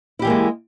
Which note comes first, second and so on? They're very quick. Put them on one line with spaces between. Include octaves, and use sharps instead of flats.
E4 G4 E3 A#3 G#3